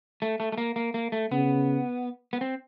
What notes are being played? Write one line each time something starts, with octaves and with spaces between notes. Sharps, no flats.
A3
A3
A3
A#3
A#3
A#3
A3
C#3 B3
B3
C4